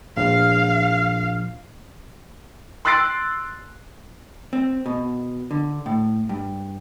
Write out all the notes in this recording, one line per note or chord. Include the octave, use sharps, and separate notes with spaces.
A#1 F5
C6 E6 F#6 A6 C7 D7
C4
B2
D3
A2
G2